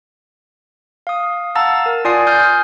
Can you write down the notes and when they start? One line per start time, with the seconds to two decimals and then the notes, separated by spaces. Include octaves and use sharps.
1.07 F5 D#6
1.55 F5 F#5 A5 A#5 E6 A6
1.86 A#4
2.05 F4 D5 G#5 D#6 C7
2.27 G#5 D#6 F6 G6